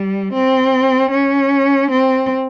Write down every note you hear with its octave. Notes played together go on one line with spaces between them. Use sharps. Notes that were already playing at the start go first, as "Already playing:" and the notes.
Already playing: G3
C4
C#4
C4